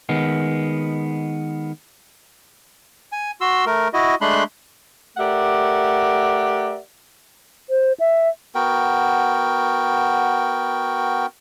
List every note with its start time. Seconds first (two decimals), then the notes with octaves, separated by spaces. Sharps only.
0.09 D#3 G#3 B3
3.12 G#5
3.41 F#4 C6 E6
3.66 A3 A#4
3.94 E4 F#4 D#5
4.21 G#3 A3 D4 B5 C6 F#6
5.17 A3 G4 A#4 D5 E5 F#5
7.70 C5
8.00 E5
8.55 B3 F#4 A#4 G5